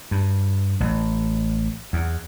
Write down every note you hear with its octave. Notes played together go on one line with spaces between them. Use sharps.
G2
A1
E2